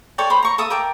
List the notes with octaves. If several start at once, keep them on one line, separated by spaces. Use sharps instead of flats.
A4 C#5 D5 G5
C5 B5
A#5 C#6
A4 E5 D#6
A#4 G5 A5 D6